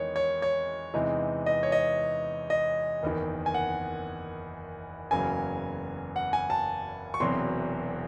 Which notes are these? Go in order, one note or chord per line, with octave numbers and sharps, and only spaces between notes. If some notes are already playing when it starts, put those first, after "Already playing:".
Already playing: E2 D#3 G#3 C#5
C#5
C#5
E2 C3 E3 G#3 D#4
D#5
C#5
D#5
D#5
F#1 E2 D#3
G#5
F#5
F#1 E2 C#3 F#3 G#5
F#5
G#5
A5
C#6
E1 E2 C3 F#3 C4 C6